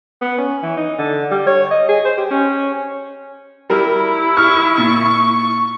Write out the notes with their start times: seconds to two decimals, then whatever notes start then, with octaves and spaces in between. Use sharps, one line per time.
0.21 B3
0.38 C#4
0.63 E3
0.77 D#4
0.98 D3
1.31 G3
1.46 C#5
1.71 D#5
1.89 G#4
2.05 C5
2.17 G4
2.31 C#4
3.70 G3 E4 A#4
4.37 C#6 F6
4.78 A#2